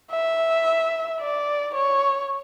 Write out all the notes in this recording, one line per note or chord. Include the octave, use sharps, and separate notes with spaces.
E5
D5
C#5